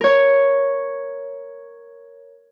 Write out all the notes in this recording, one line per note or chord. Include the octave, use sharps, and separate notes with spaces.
A#4 C#5